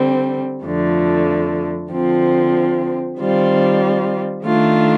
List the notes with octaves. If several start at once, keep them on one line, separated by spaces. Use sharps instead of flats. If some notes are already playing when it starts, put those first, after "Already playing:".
Already playing: D3 G3 C4
F2 D3 F3 A3
D3 F3 C4
D#3 G3 C4 F4
D#3 A3 D4 F4